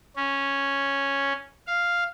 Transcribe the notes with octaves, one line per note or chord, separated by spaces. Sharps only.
C#4
F5